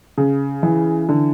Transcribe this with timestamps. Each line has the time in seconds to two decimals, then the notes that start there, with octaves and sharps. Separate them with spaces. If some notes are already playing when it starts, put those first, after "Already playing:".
0.18 C#3
0.63 E3
1.09 D3